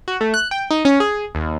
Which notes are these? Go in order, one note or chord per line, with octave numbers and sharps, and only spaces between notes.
F#4
A3
F#6
G5
D#4
C#4
G#4
D#2